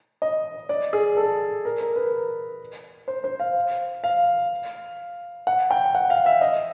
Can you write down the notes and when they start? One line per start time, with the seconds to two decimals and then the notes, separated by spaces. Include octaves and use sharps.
0.22 D#5
0.69 D5
0.93 G#4
1.17 A4
1.65 A#4
1.81 A#4
1.96 B4
3.08 C5
3.24 C5
3.40 F5
4.04 F5
5.47 F#5
5.71 G5
5.95 F#5
6.10 F5
6.26 E5
6.41 D#5